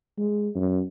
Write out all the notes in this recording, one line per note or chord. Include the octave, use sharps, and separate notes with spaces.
G#3
F#2